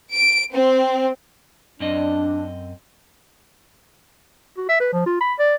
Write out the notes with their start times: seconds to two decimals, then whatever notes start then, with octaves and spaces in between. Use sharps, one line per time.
0.14 D7
0.53 C4
1.80 F#2 C4 D4 D#5
4.57 F#4
4.69 E5
4.80 B4
4.93 F3
5.06 F4
5.21 B5
5.39 D5